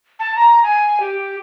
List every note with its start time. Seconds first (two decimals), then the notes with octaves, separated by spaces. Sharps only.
0.19 A5
0.36 A#5
0.63 G#5
1.00 G4